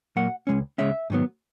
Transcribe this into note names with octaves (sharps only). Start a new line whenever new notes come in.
A#2 F#3 A#3 F#5
C#2 C#3 G#3 C#4
C#2 C#3 G#3 C#4 E5
G#2 D#3 F#3 B3